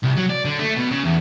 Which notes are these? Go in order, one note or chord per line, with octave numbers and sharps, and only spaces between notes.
C2
F#3
D5
D3
A3
B2
C#3
E2